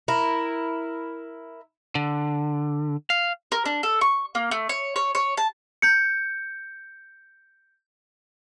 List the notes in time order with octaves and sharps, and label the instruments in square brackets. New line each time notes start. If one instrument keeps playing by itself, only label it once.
[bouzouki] E4 A#4
[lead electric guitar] D3
F5
[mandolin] A#4
D4
A4
C#6
A#3
A3
C#5
C#5
C#5
A5
[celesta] G6 C#7